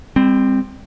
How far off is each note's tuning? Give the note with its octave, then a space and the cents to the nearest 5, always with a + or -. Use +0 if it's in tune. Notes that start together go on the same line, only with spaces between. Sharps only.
G3 +45 C4 +0